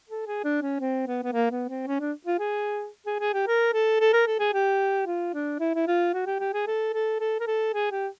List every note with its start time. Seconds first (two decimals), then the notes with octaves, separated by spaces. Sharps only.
0.09 A4
0.27 G#4
0.44 D4
0.62 C#4
0.80 C4
1.07 B3
1.23 B3
1.33 A#3
1.51 B3
1.69 C4
1.87 C#4
2.00 D4
2.27 F4
2.40 G#4
3.07 G#4
3.20 G#4
3.34 G4
3.47 A#4
3.74 A4
4.00 A4
4.13 A#4
4.27 A4
4.40 G#4
4.54 G4
5.06 F4
5.34 D4
5.60 E4
5.75 E4
5.88 F4
6.13 F#4
6.26 G4
6.40 G4
6.53 G#4
6.67 A4
6.94 A4
7.20 A4
7.40 A#4
7.47 A4
7.74 G#4
7.92 G4